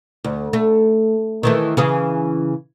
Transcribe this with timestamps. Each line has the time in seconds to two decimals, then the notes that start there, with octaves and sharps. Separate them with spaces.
0.24 D2
0.53 A3
1.43 D#3 E3 A3
1.77 C#3 E3 G#4